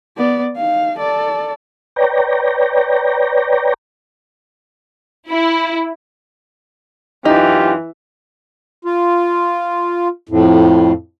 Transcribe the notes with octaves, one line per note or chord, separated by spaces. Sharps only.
B3 D5
D#4 F5
A4 D5
B4 C#5 D5 G5 A#5
E4
F#2 E3 D#4 F4 G4
F4
F2 A2